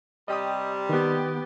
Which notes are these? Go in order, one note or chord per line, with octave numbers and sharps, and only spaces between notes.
C3 G3 D#5 G5 D#6
D#3 B3 G4